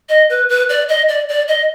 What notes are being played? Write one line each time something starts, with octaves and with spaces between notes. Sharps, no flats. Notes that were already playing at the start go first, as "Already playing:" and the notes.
D#5
B4
B4
D5
D#5
D5
D5
D#5